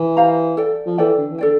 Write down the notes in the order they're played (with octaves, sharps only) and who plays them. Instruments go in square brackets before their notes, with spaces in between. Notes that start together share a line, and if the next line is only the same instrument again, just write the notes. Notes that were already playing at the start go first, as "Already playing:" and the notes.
Already playing: [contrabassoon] E3
[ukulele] G4 C5 F5 A#5
A4 D5 G5
[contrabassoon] F3
[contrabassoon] E3 [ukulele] A4 D5 G5
[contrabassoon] D3
E3
[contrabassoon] D3 [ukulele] A4 D5 G5